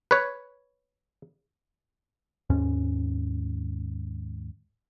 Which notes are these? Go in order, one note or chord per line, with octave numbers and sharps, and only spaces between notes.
B4 C#5
D#2 G#2 C#4